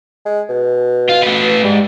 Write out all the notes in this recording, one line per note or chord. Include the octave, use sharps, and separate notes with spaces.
G#3
B2
F4
A3 B4
G#2 G3